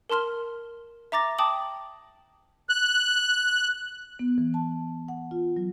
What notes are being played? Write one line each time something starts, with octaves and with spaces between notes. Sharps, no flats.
A#4 A5 C6 F6 G7
E5 A#5 D6 A6 A#6
G5 A5 D6 D#6 F#7
F#6
B3
E3
A5
F#5
F4
F#3